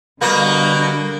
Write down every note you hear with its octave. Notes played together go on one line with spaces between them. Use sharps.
B2 D3 G3 A#3